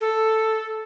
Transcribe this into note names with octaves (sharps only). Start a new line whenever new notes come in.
A4